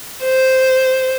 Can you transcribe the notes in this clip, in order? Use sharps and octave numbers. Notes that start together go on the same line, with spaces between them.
C5